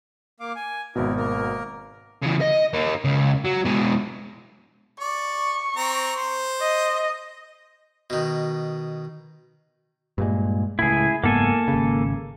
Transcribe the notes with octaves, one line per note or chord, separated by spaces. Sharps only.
A#3 F5 D6
G#5
G#1 B2 E4 A#4
A#3 A#4
C#3 E3
D#5
A#3 D#4
C#2 C#3
F#3
B2 G#3
D5 C#6
C4 A#5
C5
D#5
B2 D#3
G2 A#2 G#3
C#2 A2 E4 G#4
F#1 G#2 A#3 B3 A4 G#5
G#1 C#3